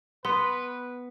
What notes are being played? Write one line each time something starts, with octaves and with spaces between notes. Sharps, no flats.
B3 B4 C6